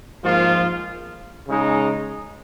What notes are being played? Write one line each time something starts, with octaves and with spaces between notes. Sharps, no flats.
G#2 F3 A#3 F4
C#3 G#3 D#4